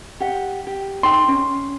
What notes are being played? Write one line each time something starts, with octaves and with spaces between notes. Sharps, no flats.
G4 F#5
G4
D#4 G#4 G5 C6
C#4